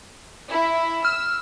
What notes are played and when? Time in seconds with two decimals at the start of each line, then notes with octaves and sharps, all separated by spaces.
0.50 E4
1.05 E6 F6